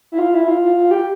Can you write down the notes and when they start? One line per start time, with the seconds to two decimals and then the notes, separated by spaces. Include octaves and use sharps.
0.12 E4
0.18 F4
0.34 E4
0.48 F4
0.62 F4
0.76 F4
0.91 G4